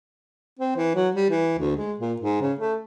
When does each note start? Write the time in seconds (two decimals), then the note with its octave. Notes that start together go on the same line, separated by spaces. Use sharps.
0.59 C4
0.76 E3
0.95 F#3
1.15 G3
1.30 E3
1.58 D2
1.77 G#3
2.00 A#2
2.20 G#2
2.41 C#3
2.59 A3